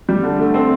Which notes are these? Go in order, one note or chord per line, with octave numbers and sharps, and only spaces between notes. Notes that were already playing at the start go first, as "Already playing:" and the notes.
G3
D3
A3
C4